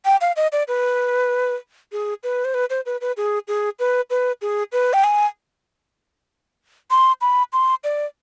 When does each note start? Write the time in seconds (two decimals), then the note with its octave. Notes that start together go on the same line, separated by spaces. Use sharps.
0.05 G5
0.21 F5
0.36 D#5
0.52 D5
0.68 B4
1.92 G#4
2.23 B4
2.45 C5
2.54 B4
2.70 C5
2.86 B4
3.01 B4
3.17 G#4
3.48 G#4
3.79 B4
4.10 B4
4.41 G#4
4.72 B4
4.93 G5
5.04 G#5
6.91 C6
7.21 B5
7.53 C6
7.84 D5